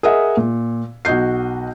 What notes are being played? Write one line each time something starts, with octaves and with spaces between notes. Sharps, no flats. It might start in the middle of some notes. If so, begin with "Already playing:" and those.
G#4 A#4 D#5 E5 F#5
A#2
B1 F#4 D#5 G6 C7